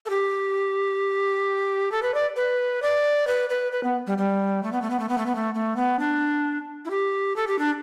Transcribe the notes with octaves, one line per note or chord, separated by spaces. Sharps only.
A4
G4
A4
B4
D5
B4
D5
B4
B4
B4
B3
G3
G3
A3
B3
A3
B3
A3
B3
A3
B3
A3
A3
B3
D4
E4
G4
A4
G4
D4